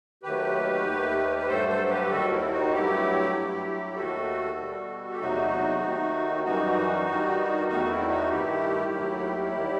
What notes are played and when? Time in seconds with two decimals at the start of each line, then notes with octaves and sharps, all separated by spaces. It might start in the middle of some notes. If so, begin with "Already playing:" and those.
0.23 D#2 D#3 F#3 A3 G4 B4
0.85 D#2 D#3 A3
1.37 B4
1.47 G2 F#3 A3 A4 C5
1.68 A4 C5
1.89 G4 B4
2.09 D#2 D#3 G3 F#4 A4
2.30 C4 E4
2.51 D#4 F#4
2.71 G2 F#3 A3 E4 G4
3.33 G2 F#3 A3
3.95 D#2 D#3 A3 F#4 A4
4.57 B2 G3
5.10 G4
5.19 E2 C3 F#3 A3 D#4 F#4
5.81 D#2 D#3 A3
6.44 F#2 E3 G3 D#4 F#4
7.06 G2 D#3 G3
7.68 E2 D#3 A3 D#4 F#4
7.84 D#4
7.88 C4 E4
8.09 D#4 F#4
8.30 G2 D#3 A3 E4 G4
8.92 D#2 D#3 F#3 A3
9.54 D#2 D#3 G3